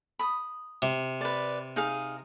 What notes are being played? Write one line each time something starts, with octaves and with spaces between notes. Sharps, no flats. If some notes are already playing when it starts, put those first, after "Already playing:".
B5 D#6
C3
B4 D5
D#4 G#4 F5